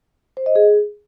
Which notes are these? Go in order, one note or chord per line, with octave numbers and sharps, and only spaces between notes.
C5
D#5
G#4